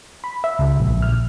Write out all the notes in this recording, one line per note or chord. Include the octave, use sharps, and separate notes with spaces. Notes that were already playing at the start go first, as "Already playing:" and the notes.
B5
E5
C#2
A#1
F6